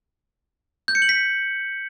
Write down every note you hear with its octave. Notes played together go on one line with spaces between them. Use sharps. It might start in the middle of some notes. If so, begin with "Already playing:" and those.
G6
C#7
F#7
B6